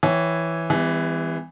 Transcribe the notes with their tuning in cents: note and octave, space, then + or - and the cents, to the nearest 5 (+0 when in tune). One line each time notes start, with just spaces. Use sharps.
E3 +0 C#5 -5 G5 -35
E3 +0 G3 +45 B3 +45